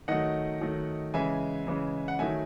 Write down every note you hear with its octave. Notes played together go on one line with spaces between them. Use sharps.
D#3 F#3 A3 D#5 F#5
D#3 F#3 A3
C#3 E3 G#3 E5 G#5
C#3 E3 G#3
F#5
D#3 F#3 A3 E5 G#5